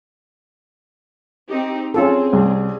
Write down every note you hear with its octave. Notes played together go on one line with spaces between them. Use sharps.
C4 D#4 G4
C4 C#4 F4 G#4 A4
C2